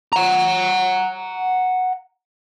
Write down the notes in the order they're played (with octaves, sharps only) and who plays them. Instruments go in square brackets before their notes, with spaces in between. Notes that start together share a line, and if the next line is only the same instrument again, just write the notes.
[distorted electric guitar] F#5 A#5